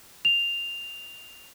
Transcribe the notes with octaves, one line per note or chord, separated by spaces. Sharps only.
F7